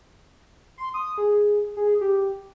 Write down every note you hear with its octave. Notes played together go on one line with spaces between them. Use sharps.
C6
D#6
G#4
G#4
G4